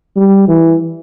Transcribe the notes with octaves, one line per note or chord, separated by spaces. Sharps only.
G3
E3